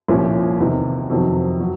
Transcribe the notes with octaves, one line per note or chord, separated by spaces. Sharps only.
C2 A#2 F3 A#3 C#4
E2 C3 D#3
F2 C3 D#3 F#3
F#3